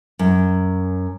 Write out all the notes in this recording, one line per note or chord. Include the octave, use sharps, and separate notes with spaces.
F#2